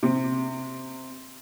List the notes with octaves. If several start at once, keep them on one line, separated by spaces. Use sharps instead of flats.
C3